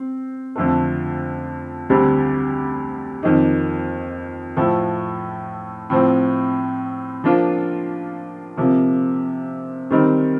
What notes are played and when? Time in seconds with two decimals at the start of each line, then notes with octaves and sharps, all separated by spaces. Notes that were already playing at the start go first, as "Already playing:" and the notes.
Already playing: C4
0.56 F2 D3 A3
1.89 D2 D3 G3 C4 G4
3.23 F2 D#3 A#3 D#4
4.57 A2 F3 A3
5.90 A2 F3 C4
7.24 F3 A#3 D4 F4
8.57 C3 F3 A#3
9.91 D#3 G3 C4 D#4 A#4